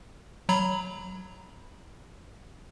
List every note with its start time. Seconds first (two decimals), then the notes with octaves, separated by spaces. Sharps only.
0.49 F#3 A#5 B5